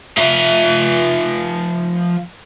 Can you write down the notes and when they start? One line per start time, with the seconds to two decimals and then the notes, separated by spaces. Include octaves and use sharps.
0.17 F3 E5